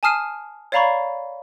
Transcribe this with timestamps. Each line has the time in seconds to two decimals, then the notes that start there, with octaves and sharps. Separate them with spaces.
0.03 G#5 A5 D#6 F6 C7 D#7
0.72 C#5 D5 F5 A#5 B5 C#6